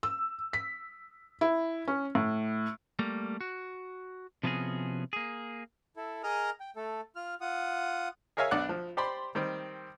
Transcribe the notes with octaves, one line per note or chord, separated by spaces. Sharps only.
E6
B6
E4
C#4
A2
G3 A3 A#3
F#4
C3 F3 B3 C#4 F#4 G#4
A#3 G#4
E4 A4
G#4 A#4 D#5 A#5 D#6 F6
G5
A3 A4
F4 F6
F4 F#5 D#6
G#4 A#4 C#5 E5 F5 G#5
B1 D4 D5 F#5 F#6
F3
G4 C5 D5 B5 C6
D#3 G3 C4